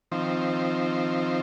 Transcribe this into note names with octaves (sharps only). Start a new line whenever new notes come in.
D#3 F3 C4